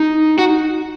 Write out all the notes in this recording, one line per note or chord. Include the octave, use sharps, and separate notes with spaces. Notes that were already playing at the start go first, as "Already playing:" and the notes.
Already playing: D#4
F#4